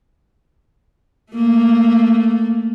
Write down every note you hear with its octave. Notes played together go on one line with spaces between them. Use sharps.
A3 A#3